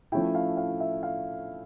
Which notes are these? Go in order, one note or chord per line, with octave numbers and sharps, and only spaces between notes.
F3 A3 C#4 E4 G5
F5
F5
E5
F5